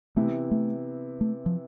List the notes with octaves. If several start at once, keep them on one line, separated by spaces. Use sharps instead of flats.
C3 E3 A3 B3 E4
A3
A3
F3